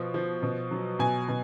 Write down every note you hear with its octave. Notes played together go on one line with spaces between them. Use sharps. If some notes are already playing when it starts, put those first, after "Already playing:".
Already playing: B2 F3
F3
B2
F#3
B2 G#5
B2